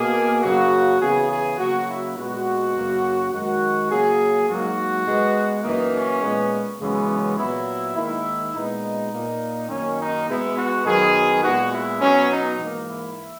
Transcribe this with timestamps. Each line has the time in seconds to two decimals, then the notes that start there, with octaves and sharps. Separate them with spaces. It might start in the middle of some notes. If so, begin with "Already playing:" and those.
Already playing: B2 A#3 G#4
0.42 F#2 C#3 F#3 A#3 F#4
0.99 C#3 E3 B3 G#4
1.29 G#4
1.57 C#3 F#3 A#3 F#4
1.87 E4
2.15 A#2 G#3 B3 F#4
2.74 F#2 C#3 F#3 A#3
3.31 F#2 D#3 G#3 F#4
3.89 C#3 F#3 A#3 G#4
4.47 G#2 F#3 A#3 F#4
5.05 B2 G#3 B3
5.62 F#2 E3 A#3 D#4
5.92 C#4
6.21 A#2 G#3 B3
6.78 F#2 C#3 E3 G#3 B3 C#4
7.08 C#4
7.36 A#2 F#3 B3 E4
7.95 G#2 D#3 A#3 E4
8.52 A#2 G#3 B3 D#4
9.10 A#2 A#3
9.69 F#2 D#3 A#3 C#4
9.97 D#4
10.26 B2 G#3 B3 E4
10.55 F#4
10.85 F#2 D#3 F#3 B3 G#4
11.42 A#2 G#3 B3 F#4
11.71 E4
11.99 B2 F#3 B3 C#4
12.29 D#4
12.58 G#2 E3 A#3
12.87 E4